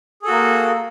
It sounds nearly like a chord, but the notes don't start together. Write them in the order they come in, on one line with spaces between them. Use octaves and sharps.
G#4 A4 F#4 A#3